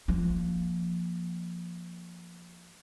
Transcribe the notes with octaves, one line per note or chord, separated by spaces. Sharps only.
F3 A#3